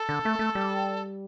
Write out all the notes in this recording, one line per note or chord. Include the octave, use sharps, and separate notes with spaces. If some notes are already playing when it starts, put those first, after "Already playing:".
Already playing: A4
D3
A3
A3
G3